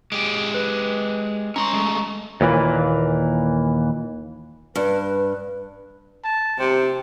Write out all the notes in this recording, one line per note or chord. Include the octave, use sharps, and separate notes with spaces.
G#3 G4 D7
B4
C#4 A#5 C6 C#6
G#3 A3
D#2 A#2 E3
G2 B4
A5
C3 G4 C5